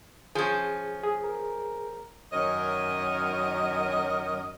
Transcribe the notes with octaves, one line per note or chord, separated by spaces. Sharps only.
F3 C#4 G#4
G#4
A#4
F#2 D#3 C#4 A#4 C#5 D#5